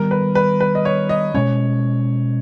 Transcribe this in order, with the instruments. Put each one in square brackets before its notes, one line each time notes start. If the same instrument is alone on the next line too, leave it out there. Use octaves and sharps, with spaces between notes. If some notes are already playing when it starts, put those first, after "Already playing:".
Already playing: [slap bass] D#3 G3 B3 [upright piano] A#4
[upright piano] B4
B4
B4
D#5
C#5
D#5
[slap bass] B2 G#3 C#4 [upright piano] C#5